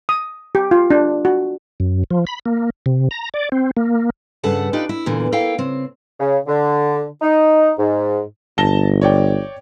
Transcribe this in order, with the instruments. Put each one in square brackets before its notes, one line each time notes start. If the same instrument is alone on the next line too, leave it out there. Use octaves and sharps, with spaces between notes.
[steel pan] D#6
G4
F4
D4
F#4
[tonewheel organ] F#2
F3
B5
A#3
C3
A#5
D5
C4
A#3
[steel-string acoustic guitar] G2 C#3 A4 B4 F#5 A5
D4 D#4 F4 G4 B4
E4
E2 A#2 D3 E3
A#3 E4 A4 F5 G5
C#3 C4
[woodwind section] C#3
D3
D#4
G#2
[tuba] G1 [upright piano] A5 A#6 G7
[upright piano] C#5 D5 G5